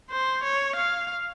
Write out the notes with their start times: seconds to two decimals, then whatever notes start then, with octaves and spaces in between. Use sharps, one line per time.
0.11 C5
0.43 C#5
0.76 F5